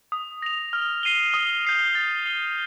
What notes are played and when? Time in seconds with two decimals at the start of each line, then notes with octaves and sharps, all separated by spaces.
0.12 D#6
0.42 A#6 F7
0.73 F6
1.03 C7 D#7 G7
1.34 D#6
1.65 G6 C7 D#7
1.95 A6
2.26 C7 G7